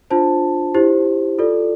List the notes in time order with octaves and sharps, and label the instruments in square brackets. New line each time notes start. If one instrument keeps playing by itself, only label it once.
[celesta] D4 F4 C5 A5
E4 G4 C5
F4 A4 D5